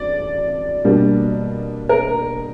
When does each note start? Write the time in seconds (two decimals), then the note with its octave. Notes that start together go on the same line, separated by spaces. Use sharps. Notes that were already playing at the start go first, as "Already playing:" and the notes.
Already playing: D5
0.84 B2 G3 A#3 D4
1.89 A#4